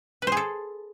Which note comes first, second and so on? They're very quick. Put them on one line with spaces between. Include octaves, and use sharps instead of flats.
B4 C5 G#4 A4